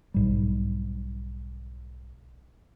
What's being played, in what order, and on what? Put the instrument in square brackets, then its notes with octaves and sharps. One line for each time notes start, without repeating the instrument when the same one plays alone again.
[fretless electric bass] B1 G#2 G3